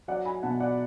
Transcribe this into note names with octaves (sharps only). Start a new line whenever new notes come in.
F#3 D5 F#5
G#5 B5
B2 F#5 A5
D5 F#5